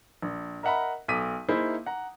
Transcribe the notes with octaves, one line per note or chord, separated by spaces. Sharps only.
A#1
A#4 D#5 E5 F#5 A#5 B5
B1 A4 D6 D#6 B6 D#7
A#3 D#4 E4 G#4 C5 E5
F#5 A#5